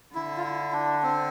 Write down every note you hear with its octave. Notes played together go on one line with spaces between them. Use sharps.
D3 E4
F4
E4
D4
C4